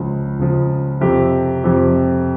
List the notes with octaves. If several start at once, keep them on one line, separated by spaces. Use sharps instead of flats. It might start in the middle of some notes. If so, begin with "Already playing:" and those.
Already playing: C#2 C#3 F3
C#2 C#3 F3
F2 C3 F3 C4 G4
F2 C3 F3 C4 G4